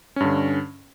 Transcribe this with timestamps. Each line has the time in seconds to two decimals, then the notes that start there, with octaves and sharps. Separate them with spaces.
0.16 C#4
0.20 G2
0.25 D3